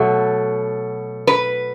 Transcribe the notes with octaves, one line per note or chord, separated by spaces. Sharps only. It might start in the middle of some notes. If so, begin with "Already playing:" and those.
Already playing: B2 F#3 A3
B4